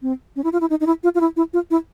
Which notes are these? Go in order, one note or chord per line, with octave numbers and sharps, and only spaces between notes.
C4
C#4
E4
F4
E4
D#4
D#4
E4
F4
F4
E4
E4
F4
E4